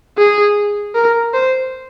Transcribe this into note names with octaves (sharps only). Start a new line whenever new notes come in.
G#4
A#4
C5